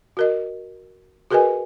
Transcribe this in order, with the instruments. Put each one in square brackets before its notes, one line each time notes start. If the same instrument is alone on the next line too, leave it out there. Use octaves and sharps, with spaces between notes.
[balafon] F#4 A#4 D#5
F#4 G#4 A#4 B4 D#5 G#5